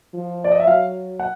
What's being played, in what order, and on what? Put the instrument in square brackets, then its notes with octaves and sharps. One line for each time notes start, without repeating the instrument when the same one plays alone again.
[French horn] F3
[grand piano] D5
D#5
E5
[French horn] F#3 [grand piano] F5
[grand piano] F#5